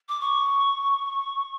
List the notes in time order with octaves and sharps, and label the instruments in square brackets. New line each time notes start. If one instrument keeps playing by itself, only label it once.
[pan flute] D6
C#6